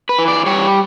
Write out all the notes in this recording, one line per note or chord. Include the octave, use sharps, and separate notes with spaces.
B4
E3
D5
G3 C#5